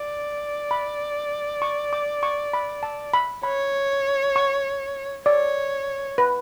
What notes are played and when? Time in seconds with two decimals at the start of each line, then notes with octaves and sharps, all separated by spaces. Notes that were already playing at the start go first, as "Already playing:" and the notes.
Already playing: D5
0.71 B5
1.62 C#6
1.93 D6
2.23 C#6
2.53 B5
2.83 A5
3.14 B5
3.43 C#5 B5
4.36 C#6
5.26 C#5 D5
6.18 B4